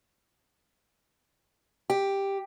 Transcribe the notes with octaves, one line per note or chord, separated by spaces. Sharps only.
G4